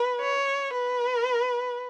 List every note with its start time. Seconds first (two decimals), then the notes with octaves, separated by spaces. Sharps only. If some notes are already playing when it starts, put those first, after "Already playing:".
Already playing: B4
0.20 C#5
0.73 B4